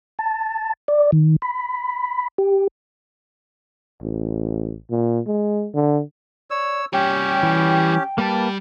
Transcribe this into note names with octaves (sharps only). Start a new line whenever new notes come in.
A5
D5
D#3
B5
G4
A1
A#2
G#3
D3
C#5 D5 E6
G3 C#4 G4 C#5 G5
E3
G3 A#3 B4 A5